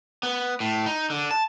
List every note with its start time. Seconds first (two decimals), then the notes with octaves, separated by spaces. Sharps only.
0.23 B3
0.60 A2
0.86 D#4
1.10 D3
1.31 A5